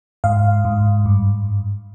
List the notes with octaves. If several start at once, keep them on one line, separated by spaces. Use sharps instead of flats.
G#2 F5
G#2
G2